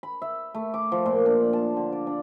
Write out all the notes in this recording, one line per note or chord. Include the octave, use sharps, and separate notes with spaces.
B5
E5
A3
D6
F3
A#2
D4
A5
D3
D5
D4